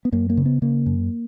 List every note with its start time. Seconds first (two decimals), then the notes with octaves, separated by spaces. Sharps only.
0.05 B3
0.12 F#2 A#3
0.30 A#3
0.37 C#3
0.46 B3
0.62 C#3 A#3
0.86 F#2